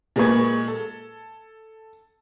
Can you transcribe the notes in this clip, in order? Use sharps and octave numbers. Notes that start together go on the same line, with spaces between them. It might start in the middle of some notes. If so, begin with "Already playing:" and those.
A#2 G#3 G#4 B4 C#6 G#6
A4